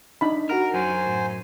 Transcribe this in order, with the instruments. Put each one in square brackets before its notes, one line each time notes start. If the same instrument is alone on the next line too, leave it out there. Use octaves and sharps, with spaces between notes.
[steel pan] D4 D#4 B5
[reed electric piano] F#4 F#5 F6 [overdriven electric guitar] A#4
[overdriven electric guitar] F#2 [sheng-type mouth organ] C5 G#5
[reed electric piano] A2